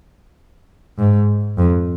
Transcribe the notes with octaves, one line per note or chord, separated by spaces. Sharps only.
G#2
F2